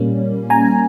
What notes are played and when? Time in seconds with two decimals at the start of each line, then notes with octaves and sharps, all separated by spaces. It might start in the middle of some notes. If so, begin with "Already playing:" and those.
Already playing: A#2 G3 A#3 C#4
0.50 G#5 A#5